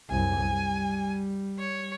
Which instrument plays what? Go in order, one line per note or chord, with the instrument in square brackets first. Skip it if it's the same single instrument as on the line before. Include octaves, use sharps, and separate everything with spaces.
[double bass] C2 F#2 [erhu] G#5
[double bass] G3
[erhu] C#5